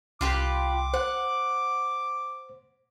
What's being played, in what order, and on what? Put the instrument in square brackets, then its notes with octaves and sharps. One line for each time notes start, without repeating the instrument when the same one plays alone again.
[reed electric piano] C2 [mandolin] F4 G4 B4 [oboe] D6
[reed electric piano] C5 [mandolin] F#5